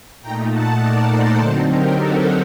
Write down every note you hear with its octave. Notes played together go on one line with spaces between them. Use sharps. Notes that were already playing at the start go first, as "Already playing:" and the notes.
A#2 A3 D#4 G5 A#5
F#5 A5
A#4 D5
A4 C5
D3 F#3 C4 D#4
G4 A#4
F#4 A4